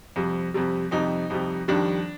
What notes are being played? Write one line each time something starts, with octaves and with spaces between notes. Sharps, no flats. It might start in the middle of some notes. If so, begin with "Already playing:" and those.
F2 C3 G3
F2 C3 G3
F2 C3 G3 D#4
F2 C3 G3
F2 D#3 G3 D4